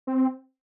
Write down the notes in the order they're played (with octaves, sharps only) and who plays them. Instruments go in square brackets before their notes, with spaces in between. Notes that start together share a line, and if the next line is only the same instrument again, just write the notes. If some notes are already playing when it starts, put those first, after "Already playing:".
[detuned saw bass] C4